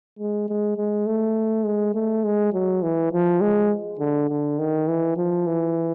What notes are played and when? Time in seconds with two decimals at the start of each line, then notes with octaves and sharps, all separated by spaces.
0.19 G#3
0.49 G#3
0.77 G#3
1.06 A3
1.65 G#3
1.94 A3
2.24 G#3
2.53 F#3
2.82 E3
3.12 F3
3.41 G#3
3.99 D3
4.29 D3
4.59 D#3
4.88 E3
5.17 F3
5.46 E3